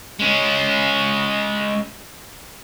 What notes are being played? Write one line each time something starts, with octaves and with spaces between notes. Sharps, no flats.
G#3 C#4